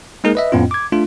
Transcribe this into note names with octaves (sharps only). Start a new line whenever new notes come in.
G#3 A#3 D#4 G#4 A#4
B4 D#5 E5
F2 A2 B3 C#4 F4
D6 G#6
A3 D4 F4